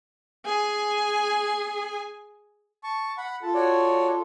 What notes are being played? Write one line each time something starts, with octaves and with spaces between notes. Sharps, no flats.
G#4 G#5
A5 C#6
F#5 B5
F4 A4 A5
F#4 C#5 D5